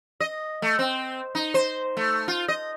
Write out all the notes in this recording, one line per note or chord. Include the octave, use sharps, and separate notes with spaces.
D#5
A3
C4
D#4
C5
A3
F4
D#5